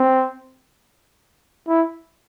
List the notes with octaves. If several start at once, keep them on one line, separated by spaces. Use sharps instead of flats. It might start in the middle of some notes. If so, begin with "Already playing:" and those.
Already playing: C4
E4